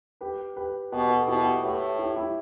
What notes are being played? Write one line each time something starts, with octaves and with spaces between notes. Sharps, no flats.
G4 B4
G4 B4
B2 G4 B4
F#4 A4
A4
B2 E4 G4
G4
F#4 A4
A2 G4 B4
E4 G4
E4 G4